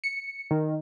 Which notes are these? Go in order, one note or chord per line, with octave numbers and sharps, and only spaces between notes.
C#7
D#3